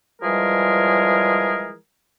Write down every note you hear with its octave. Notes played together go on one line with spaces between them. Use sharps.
E3 F3 G3 G#3 G#4 A#4